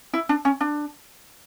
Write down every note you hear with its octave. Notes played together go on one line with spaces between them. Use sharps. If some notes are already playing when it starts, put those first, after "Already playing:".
E4
D4
C#4
D4